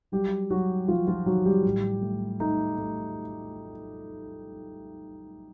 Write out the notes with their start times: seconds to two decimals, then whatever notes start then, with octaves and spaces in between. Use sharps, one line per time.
0.12 F#3 G3 G4
0.50 F#3 F#4
0.88 F3 F#3 F4
1.08 F3 F4
1.26 D#3 F#3 F#4
1.45 G3 G4
1.65 A2
2.02 A3
2.40 A3 D#4
2.78 A3